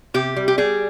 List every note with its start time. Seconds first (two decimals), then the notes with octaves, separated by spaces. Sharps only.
0.14 C3 G4
0.36 G3
0.48 G4
0.58 G3 G#4